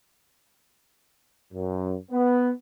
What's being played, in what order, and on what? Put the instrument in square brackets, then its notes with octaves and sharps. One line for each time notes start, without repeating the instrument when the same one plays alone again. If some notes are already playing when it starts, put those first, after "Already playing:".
[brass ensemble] F#2
B3